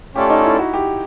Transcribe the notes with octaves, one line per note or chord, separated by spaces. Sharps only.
A3 C#4 F4 G4 A4 D5
D#4
E4
F#4
G4